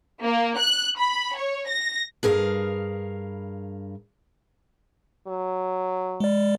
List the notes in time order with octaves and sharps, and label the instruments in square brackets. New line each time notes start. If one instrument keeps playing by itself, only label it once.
[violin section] A#3
F#6
B5
C#5
A#6
[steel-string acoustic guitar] G2 G#4 A#4 F5
[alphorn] F#3
[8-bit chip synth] G#3 D5